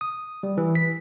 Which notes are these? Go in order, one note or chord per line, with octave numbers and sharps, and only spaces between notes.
D#6
G3
E3
B6